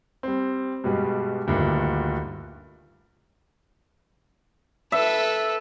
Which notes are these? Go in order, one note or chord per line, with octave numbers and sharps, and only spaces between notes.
G3 C4
G2 B2 G3 G#3
D2 G2 A#2 D3 D#3
A4 B4 E5